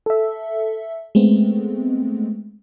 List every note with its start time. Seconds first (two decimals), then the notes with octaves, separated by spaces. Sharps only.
0.06 A4 E5
1.15 G#3 A3 B3 C4